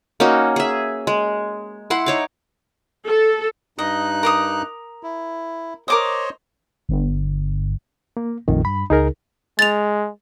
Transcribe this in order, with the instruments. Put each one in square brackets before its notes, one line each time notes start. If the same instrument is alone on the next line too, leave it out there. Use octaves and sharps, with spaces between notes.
[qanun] A#3 C#4 D#4 F#4
G#4 E5
G#3
E4 F#5 C6
D#4 C#5 D6
[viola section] A4
[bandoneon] G2 D#4 F#6 [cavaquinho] D#5
[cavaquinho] A#4 D6 D#6
[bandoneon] E4
[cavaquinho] A#4 D6 D#6 [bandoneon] C5 C#5 D#5
[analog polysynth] G1
[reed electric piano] A#3
[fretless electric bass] A#1 A3 [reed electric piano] F2 D#3
[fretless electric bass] G2 [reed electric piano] B5
[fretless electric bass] C#2 [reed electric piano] D#4 G#4 A#4
[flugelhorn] G#3 [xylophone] A6 F7